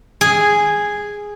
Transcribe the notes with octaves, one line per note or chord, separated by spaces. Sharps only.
G#4